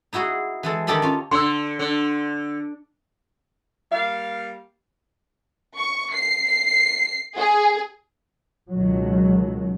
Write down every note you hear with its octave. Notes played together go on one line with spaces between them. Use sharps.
D#4 E4 F#4 G#4
E3 G#3 A4
D#3 D4 G4 A4 D#5 B5
C#4 F4
D3 C6 E6
D3
G3 A#3 F5
C#6
C7
C7
G#4
C#2 B2 D#3 F#3